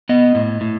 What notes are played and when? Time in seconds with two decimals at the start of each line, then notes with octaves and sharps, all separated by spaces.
0.09 B3 D#5
0.35 A2
0.61 A2